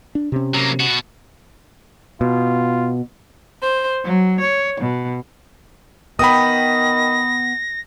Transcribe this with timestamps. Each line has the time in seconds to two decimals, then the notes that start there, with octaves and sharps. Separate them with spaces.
0.15 D4
0.32 C3 C#4
0.54 F#3 A#3
0.80 B2 F#4
2.21 B2 F4
3.61 C5
4.04 F#3
4.40 C#5
4.80 B2
6.19 D#3 B3 G5 B5 D#6 A#6